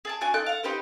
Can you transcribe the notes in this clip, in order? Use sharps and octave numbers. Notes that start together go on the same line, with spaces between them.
G#4 D5 A5
D4 F#4 G#5
D#4 A4 G5 F#6
F5 F#5
D#4 G4 B4 C5